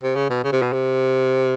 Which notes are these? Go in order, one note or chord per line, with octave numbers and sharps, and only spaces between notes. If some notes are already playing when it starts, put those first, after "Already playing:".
C3
C#3
B2
C#3
C3
B2
C3